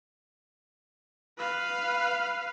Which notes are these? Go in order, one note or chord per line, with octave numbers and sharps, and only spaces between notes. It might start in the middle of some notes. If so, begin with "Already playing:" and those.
B4 F5